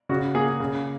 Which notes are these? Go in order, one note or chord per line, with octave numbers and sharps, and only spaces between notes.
C#3 F#4
A#3 G#4
C#3